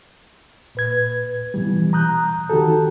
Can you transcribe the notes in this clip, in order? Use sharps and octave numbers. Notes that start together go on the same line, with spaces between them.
A#2 B4 G#6
B2 E3 G3
A#5 D#6 F#6 G6
D#3 F#4 G4 A4